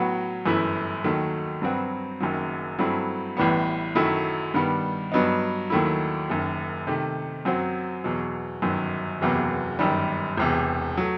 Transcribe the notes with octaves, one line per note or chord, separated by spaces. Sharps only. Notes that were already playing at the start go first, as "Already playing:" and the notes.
Already playing: A2 F#3 B3 F#4
G1 F#2 E3 A3 E4
D#2 D#3 F#3 A3
G2 F#3 C4 F#4 B4
F#1 F#2 D#3 F#3
G2 F#3 A3 C4 E4
A1 A2 E3 G3 B3
F#2 D#3 F#3 A3 E4
G2 D#3 G3 B3
G2 F#3 B3 D#4
D#2 D#3 F#3 A3 E4
F#1 F#2 D#3
C3 D#3 A3
F#2 F#3 C4 F#4 C5
E2 B2 F#3
G1 F#2 D#3 F#3
F#1 E2 C3 F#3 B3
G1 F#2 D#3 G3
E1 E2 C3
F#3 A3